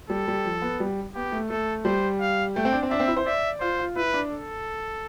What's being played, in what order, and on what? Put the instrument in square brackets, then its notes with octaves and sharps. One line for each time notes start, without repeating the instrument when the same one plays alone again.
[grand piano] G3 [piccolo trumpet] A4
[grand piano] G3
F3
B3
G3
[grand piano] B3 [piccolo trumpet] G4
[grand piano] A3
[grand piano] A3 [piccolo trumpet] A4
[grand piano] G3 [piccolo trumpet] C5
[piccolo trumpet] F5
[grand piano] A3 [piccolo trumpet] G5
[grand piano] C4
D4
C4
[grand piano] D4 [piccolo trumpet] E5
[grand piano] C4
E4
C5
[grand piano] D5 [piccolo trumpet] E5
[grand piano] F4 [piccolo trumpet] C5
[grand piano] F4
[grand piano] E4 [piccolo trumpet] B4
[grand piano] D4
[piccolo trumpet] A4